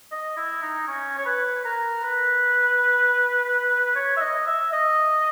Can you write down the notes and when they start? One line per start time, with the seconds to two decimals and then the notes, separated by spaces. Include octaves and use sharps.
0.12 D#5
0.37 E4
0.62 D#4
0.88 C#4
1.18 C#5
1.26 B4
1.65 A#4
2.04 B4
3.95 C#5
4.17 E5
4.21 D#5
4.46 E5
4.72 D#5